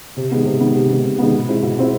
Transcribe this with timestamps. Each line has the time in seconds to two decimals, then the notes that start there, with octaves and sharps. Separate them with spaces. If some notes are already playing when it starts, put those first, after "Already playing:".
0.17 C3
0.31 D#3 G#3 B3
0.45 C3
0.60 D#3 G#3 B3
0.75 C3
0.89 D#3 G#3 B3
1.04 C3
1.18 D#3 G#3 B3
1.33 B2
1.48 G#3 C4 E4
1.62 B2
1.77 G#3 C4 E4